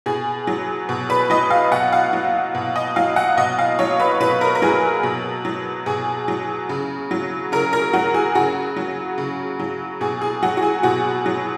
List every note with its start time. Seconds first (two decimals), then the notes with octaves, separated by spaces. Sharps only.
0.06 B2 G#4
0.47 F#3
0.89 B2
1.10 B4
1.30 F#3 D#5
1.50 F5
1.72 B2 F#5
1.92 F5
2.13 F#3
2.55 B2
2.76 D#5
2.96 F#3 F5
3.16 F#5
3.37 B2 D#5
3.59 F5
3.79 F#3 C#5
4.00 B4
4.20 B2 B4
4.41 A#4
4.55 A#4
4.62 F#3 G#4
5.03 B2
5.45 F#3
5.86 B2 G#4
6.28 F#3
6.69 C#3
7.11 F#3
7.52 C#3 A#4
7.73 A#4
7.93 F#3 F#4
8.14 G#4
8.35 C#3 F#4
8.77 F#3
9.18 C#3
9.60 F#3
10.01 B2 G#4
10.22 G#4
10.43 F#3 F#4
10.57 F#4
10.63 G#4
10.83 B2 F#4
11.26 F#3